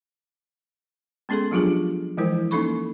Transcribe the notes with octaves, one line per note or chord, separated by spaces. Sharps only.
G#3 B3 C#4 G#4 A4 C6
F3 F#3 D4 F4 G4 G#4
E3 F3 G#3 E4 A#4 C5
A#3 C#4 D#4 A4 B5 C#6